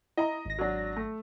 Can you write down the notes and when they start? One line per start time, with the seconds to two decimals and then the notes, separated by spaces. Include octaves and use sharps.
0.17 E4 D#5 A#5
0.45 G#1 A#6
0.59 F#3 D4
0.96 A3